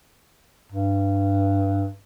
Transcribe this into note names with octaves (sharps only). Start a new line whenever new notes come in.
G2